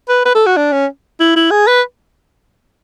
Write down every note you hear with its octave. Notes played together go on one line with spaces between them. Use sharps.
B4
B4
A4
F#4
D4
C#4
E4
E4
G#4
B4